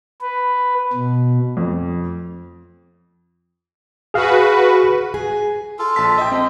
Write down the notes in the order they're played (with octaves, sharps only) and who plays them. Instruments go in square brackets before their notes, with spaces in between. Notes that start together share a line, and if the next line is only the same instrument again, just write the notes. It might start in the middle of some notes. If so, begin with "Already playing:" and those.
[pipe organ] B4
B2
[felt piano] F2
[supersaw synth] F#4 B4 [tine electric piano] G#4 F5
[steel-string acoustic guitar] G#4
[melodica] F4 A4
[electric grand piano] A#1 A5 B6
[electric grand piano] D#5 G5 [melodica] E5
[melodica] G#3 [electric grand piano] C4